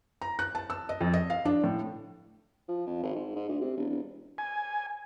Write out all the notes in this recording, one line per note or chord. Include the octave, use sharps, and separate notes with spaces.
A#5
F#6
A5
E6
D#5
F2
D#5
F5
D4
A2
F3
F2
G#1
G#2
G#2
D2
C3
E1
E1
G#5